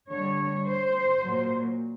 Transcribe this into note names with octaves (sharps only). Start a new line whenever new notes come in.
D3 G3 C#5
C5
A#2 F#3